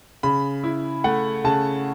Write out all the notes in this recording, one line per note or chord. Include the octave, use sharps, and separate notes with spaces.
C#3 B5
E4
A3 F#5
C#3 A5